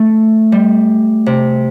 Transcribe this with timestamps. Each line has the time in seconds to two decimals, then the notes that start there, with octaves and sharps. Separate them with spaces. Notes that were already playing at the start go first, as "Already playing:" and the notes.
Already playing: A3
0.52 G3
1.26 C3